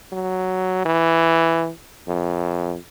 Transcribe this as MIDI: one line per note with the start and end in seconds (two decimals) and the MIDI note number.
0.12 0.81 54
0.85 1.70 52
2.07 2.76 41